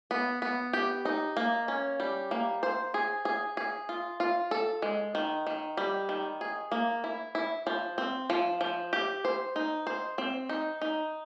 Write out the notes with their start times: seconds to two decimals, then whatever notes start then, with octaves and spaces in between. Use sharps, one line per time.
0.11 B3
0.42 B3
0.73 G4
1.05 D#4
1.37 A#3
1.68 C#4
2.00 G3
2.31 A#3
2.63 C5
2.94 G#4
3.25 G#4
3.57 G#4
3.89 F4
4.20 F4
4.51 A4
4.82 G#3
5.15 D#3
5.47 D#3
5.77 G3
6.09 D#3
6.41 G#4
6.72 A#3
7.04 E4
7.35 E4
7.67 F3
7.98 C4
8.30 F3
8.61 F3
8.93 G4
9.25 C5
9.56 D#4
9.87 C5
10.18 C4
10.49 D#4
10.81 D#4